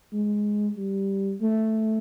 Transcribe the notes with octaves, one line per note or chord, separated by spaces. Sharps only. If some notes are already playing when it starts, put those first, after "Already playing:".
G#3
G3
A3